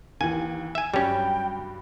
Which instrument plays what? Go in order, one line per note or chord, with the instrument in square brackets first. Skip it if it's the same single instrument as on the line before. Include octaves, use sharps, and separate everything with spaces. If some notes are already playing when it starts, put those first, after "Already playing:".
[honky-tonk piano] D#2 E3 [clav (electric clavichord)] G#5
[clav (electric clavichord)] E5 G#5
[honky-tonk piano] G2 F#3 [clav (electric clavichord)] G3 C#4 [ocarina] G5